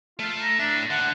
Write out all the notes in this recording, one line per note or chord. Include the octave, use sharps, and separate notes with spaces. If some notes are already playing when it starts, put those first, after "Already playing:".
A3 F4
A#5
A2 D4 E5
D3 F#5